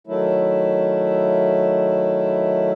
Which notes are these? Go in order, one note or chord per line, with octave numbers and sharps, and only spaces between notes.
D#3 F#3 A3 E4